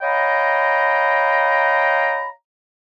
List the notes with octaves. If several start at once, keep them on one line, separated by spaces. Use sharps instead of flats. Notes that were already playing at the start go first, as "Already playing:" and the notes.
C#5 D#5 F5 G5 A#5 B5